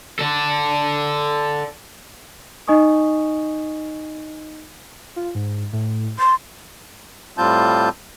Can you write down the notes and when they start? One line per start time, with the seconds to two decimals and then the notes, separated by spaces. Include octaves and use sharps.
0.19 A4 D5
2.67 D#4 D#5 G#5 C#6 D#6
5.16 F4
5.35 G#2
5.73 A2
6.19 C6 A6
7.38 A2 G3 C4 F4 A5 G6